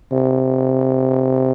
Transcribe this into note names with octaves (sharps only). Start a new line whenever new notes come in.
C3